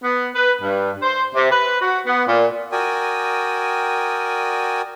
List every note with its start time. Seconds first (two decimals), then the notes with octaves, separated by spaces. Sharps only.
0.03 B3
0.35 B4
0.60 G2
1.02 C5
1.35 C3
1.50 B4
1.82 F#4
2.06 B3
2.26 A#2
2.72 F#4 A#4 D5 G5 G#5 D#6